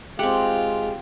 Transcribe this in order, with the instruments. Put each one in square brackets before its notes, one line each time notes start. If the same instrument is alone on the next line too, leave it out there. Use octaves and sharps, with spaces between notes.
[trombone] G#3 [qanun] C4 F#5 [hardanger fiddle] F4 [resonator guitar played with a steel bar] G4